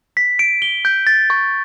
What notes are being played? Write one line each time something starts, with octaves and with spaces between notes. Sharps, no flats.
B6
D7
G7
G6
A6
C#6